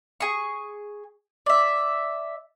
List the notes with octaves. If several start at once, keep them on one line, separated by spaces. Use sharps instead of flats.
G#4 C#6
D5 E5